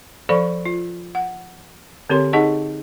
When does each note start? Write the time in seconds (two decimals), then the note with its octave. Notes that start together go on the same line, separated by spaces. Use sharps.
0.29 F3 A4 D5 F5 B5 C#6
0.65 F4
1.15 F#5
2.10 D3 C4 G4 A#4 C#5 C6
2.33 D#4 G#4 D#5 F#5 A5 C#6